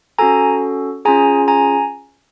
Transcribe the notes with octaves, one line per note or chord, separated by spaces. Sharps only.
C#4 F#4 A4 G#5 A#5
C#4 F4 G#4 G#5 A#5
G#5 A#5